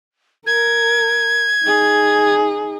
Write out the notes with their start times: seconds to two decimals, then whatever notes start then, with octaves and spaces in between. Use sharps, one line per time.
0.47 A#4 G#6
1.64 D#4 G#4